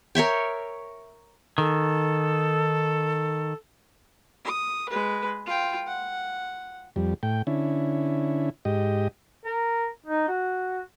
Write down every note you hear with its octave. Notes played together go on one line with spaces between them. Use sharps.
A#4 C#5 E5 G5
D#3 A4
D#6
G#3 B4
F4 G5
F#5
F2 G3
A2 G5
D3 C#4 E4
G#2 G4 D#5
A#4
D#4
F#4